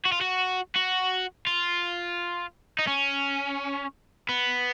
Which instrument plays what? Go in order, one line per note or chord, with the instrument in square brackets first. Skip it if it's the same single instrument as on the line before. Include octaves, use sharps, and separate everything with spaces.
[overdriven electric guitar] F#4
F4
F#4
F#4
F4
D#4
C#4
B3